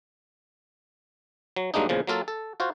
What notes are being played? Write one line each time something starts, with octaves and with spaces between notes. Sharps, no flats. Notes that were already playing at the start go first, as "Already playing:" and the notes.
F#3
G2 F#3 G#3 A#3 D4 D#4
E2 A#2 C#3 F3
F#3 A#3 F4 A4
A4
F4 F#4 C5